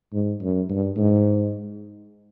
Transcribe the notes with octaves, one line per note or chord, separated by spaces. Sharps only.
G#2
F#2
G2
G#2